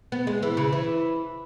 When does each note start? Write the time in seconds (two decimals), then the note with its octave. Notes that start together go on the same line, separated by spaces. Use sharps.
0.12 B3
0.27 G#3
0.43 E3
0.57 C#3
0.72 E3